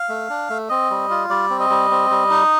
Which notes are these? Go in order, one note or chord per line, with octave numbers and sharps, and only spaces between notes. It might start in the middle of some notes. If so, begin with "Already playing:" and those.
Already playing: F5
A3
D4
A3
C4 D#5
G3
F4
G3 D5
C4
D#5
G3
C4
G3
D#4